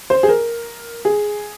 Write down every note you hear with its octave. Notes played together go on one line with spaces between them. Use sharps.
C5
G#4
A#4
G#4